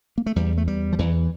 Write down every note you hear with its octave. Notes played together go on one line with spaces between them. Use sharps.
A#3
A3
E2 G3
A3
E2 G3
F3
E2 E3